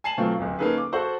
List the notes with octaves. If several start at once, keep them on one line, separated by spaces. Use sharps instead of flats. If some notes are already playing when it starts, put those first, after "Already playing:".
G#5 A5 C7 E7 F#7
B2 F#3 A3 C4 F4
D1 C#2
A#3 C#4 D#4 G#4 A4 B4
D6
F#4 A4 C5 F#5 C#6